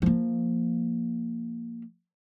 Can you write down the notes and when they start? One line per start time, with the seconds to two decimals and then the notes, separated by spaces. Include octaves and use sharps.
0.02 F3 A#3